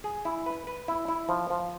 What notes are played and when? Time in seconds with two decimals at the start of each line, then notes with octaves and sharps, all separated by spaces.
0.04 G#4
0.25 E4
0.46 B4
0.67 B4
0.88 E4
1.08 E4
1.29 F3
1.50 F3